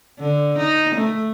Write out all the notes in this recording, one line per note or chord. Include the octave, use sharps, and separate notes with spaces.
D3
D#4
A3